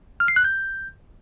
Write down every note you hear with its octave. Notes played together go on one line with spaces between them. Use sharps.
F6
C7
F#6
G6